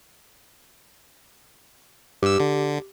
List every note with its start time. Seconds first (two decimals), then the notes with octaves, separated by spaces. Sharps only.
2.23 G2 G4 E6
2.40 D3